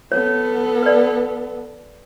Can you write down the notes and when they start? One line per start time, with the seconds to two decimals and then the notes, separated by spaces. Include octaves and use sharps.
0.12 B3 A4 C#5
0.83 B4 D5